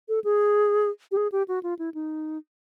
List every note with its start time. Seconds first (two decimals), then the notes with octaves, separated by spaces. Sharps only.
0.09 A4
0.24 G#4
1.12 G4
1.17 G#4
1.32 G4
1.48 F#4
1.63 F4
1.79 E4
1.94 D#4